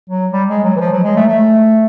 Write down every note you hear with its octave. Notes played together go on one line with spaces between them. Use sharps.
F#3
G3
G#3
F#3
E3
F3
F#3
G#3
A3
A3